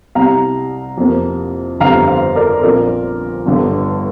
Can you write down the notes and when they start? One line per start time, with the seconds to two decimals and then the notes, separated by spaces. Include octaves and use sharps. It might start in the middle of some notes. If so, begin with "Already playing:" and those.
0.15 C2 C3 G3 F5 A#5
0.98 F2 C3 A#3
1.80 G1 F2 D3 G3 F5 A#5
2.08 C5 F5
2.35 A#4 D5
2.63 A#1 A#2 F3 C4 A#4 D5
3.46 G1 G2 D3